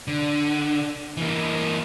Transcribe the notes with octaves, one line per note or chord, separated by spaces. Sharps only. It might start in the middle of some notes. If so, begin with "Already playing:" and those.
D3
E3 A#3